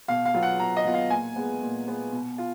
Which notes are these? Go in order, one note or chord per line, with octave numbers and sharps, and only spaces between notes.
B2 F5
F5
F#3 B3 F4
F#5
B2 A#5
D#5
F#3 B3 F4
F5
A#2 G#5
G#3 B3
A#2
G#3 B3
B2
F4